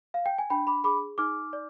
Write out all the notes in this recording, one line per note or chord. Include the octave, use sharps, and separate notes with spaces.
F5
G5
G#5
D4 G5 B5
B5 D6
G#4 B5 D6
D#4 D6 F6
D5